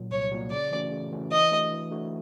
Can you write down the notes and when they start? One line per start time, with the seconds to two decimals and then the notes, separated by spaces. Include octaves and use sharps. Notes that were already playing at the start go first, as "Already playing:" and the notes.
Already playing: A#2 F#3
0.11 C2 C#5
0.31 A#2 F#3
0.51 C#3 D5
0.71 E3 A3 C#4 F#4
0.91 C#3
1.12 E3 A3 C#4 F#4
1.31 E3 D#5
1.51 A3 D4 F#4
1.71 E3
1.91 A3 D4 F#4